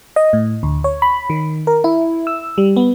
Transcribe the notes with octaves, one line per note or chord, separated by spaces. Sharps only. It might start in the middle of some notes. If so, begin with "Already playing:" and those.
D#5
A2
D2
C#5
B5
D#3
A#4
E4
E6
G3
B3